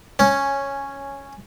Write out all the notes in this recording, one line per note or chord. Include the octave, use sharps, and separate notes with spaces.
C#4